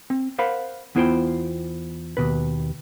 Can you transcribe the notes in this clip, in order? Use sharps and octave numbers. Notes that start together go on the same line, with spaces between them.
C4
A#4 C5 F5 F#5 B5
E2 B3 E4 F4 C5 G5
D#2 B2 B4